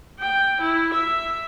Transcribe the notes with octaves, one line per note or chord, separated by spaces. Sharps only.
G5
E4
E5